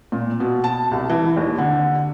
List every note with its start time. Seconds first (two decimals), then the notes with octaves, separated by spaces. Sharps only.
0.12 A#2
0.40 B2
0.64 A5
0.91 C2
1.10 E3
1.37 D#2
1.58 D3